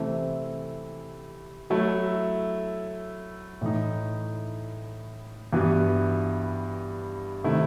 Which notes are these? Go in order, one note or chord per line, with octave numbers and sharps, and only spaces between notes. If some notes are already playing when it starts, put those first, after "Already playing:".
Already playing: C3 E3 A3 C4
F#3 A3 E4
A2 E3 A3 D#4
G2 E3 B3 F#4
C3 D#3 A3 E4